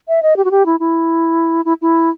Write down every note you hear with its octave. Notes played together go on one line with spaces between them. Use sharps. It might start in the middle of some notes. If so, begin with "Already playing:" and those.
E5
D#5
G4
F#4
G4
E4
E4
E4
E4